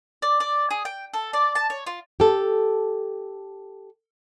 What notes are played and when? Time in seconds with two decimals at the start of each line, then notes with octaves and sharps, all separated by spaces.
0.22 D5
0.40 D5
0.70 G#4
0.85 G5
1.14 A4
1.33 D5
1.55 A5
1.70 C#5
1.87 F4
2.20 G4 A4